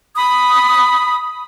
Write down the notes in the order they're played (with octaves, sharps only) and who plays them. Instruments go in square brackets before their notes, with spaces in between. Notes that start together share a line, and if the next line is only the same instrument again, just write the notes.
[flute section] B5 D#6